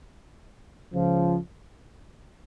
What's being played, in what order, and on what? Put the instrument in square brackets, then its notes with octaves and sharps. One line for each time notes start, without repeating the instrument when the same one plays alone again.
[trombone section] C#2 C#3 F3